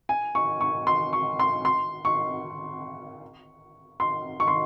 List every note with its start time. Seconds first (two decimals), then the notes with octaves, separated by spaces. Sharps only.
0.09 G#5
0.35 C#6
0.61 C#6
0.87 C6
1.13 C#6
1.39 C6
1.65 C6
2.05 C#6
4.00 C6
4.40 C#6
4.48 C6